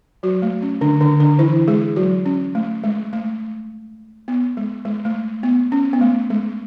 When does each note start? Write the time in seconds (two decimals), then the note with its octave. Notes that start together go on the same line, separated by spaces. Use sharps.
0.23 F#3 F#4
0.42 A3
0.62 C#4
0.81 D3 D4
1.01 D3 D4
1.20 D3 D4
1.39 E3 E4
1.68 G#3 G#4
1.96 F#3 F#4
2.25 C#4
2.55 A3
2.84 G#3
3.13 A3
4.28 B3
4.57 G#3
4.85 G#3
5.05 A3
5.43 B3
5.72 C#4
5.93 B3
6.01 A3
6.30 G#3